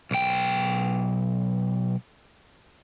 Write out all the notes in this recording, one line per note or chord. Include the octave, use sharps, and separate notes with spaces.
B1 G5